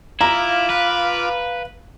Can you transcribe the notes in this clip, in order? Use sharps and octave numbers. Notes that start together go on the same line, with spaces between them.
E4 F4 F5 A#5 D6
B4